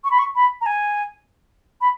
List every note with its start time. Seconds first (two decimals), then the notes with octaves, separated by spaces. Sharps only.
0.04 C#6
0.11 B5
0.18 C#6
0.35 B5
0.61 A#5
0.66 G#5
1.81 B5